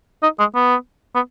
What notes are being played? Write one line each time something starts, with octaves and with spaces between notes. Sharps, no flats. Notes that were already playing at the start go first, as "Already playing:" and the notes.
D#4
G#3
B3
B3